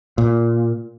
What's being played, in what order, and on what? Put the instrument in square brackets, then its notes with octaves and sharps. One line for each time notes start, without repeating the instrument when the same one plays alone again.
[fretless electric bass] A#2